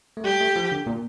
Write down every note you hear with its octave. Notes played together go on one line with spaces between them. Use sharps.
A3
G3 G4
A3
F3
D3
A#2